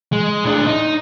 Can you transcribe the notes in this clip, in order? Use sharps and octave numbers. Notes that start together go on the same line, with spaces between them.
G#3
A2 D4
D#4